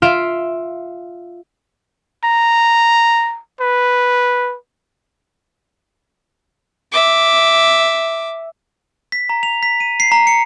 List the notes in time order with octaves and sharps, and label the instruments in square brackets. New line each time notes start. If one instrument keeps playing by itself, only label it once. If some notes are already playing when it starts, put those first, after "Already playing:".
[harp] F4 E5 F5 D7
[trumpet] A#5
B4
[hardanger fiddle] E5 D6
[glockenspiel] B6
A#5
F7
B6
D#7
C7
A#5
C#7